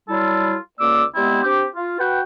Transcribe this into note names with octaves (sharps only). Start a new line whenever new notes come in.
F#3 G3 E4 F4 A4
C#2 A#3 D5 D6 E6
G3 G#3 B3 C4 E4
C4 D4 G4
F4
F#4 B4 F#5 G5